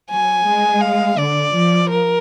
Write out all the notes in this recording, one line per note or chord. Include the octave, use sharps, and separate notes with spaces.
F#3 G#5
G#3
F5
D3 D5
F3
A#4